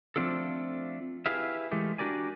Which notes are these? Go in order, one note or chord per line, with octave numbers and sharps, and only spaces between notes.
F3 A3 C4 D4 F4 A4
E4 G4 G#4 B4 E5 F5
E3 G#3 A3 G4
D4 F#4 G4 A#4 D5 G#5